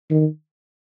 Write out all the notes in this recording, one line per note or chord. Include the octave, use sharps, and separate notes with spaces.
D#3